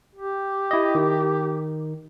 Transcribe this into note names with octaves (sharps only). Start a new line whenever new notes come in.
G4
E4 D#5
D#3